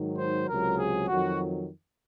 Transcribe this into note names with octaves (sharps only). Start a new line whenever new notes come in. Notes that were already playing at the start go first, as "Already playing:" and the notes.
Already playing: G#2 D#3 F#3
C5
C#2 C3 F#3 A#4
G#4
F2 D#3 F#3 F#4